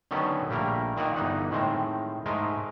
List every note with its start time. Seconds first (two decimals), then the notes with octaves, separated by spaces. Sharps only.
0.11 D3 D#3 F#3 B3 C#4
0.49 A#1 G3 A3 A#3 A#4
0.97 A#2 D#3 A#3 D5 D#5 F#5
1.16 G1 E3 D#4 F#5
1.51 A2 D#3 G#3 C4
2.26 G#2 G#3 A3 A#4 D#5